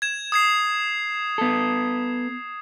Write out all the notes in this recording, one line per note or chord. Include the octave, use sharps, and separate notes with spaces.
G#6 E7
D#6 G#6 C7
B3 A4